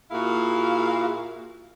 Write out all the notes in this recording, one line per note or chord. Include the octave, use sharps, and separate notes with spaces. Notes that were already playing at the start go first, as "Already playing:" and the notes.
A#2 E4 F#4 G#4 F5